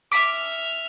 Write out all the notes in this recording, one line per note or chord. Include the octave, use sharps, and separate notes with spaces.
E5 D6 F6 B6